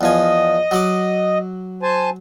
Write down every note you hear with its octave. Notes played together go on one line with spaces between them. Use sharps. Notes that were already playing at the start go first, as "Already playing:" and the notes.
E2 F3 D#5 G#5
F#3 F#5 D6
C5 G#5 A5